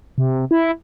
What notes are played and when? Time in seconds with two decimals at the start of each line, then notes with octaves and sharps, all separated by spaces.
0.18 C3
0.51 E4